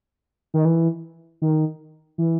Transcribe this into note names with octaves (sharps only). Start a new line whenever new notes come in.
D#3
E3
D#3
E3